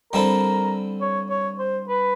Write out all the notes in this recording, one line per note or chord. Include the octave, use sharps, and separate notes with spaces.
D3 G3 C4 E4 A4 A#4
C#5
C#5
C5
B4